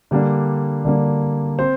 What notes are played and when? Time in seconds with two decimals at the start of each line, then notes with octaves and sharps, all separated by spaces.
0.11 D3 G3 A#3 D4
0.84 D3 G3 A#3 D4
1.59 C4 C5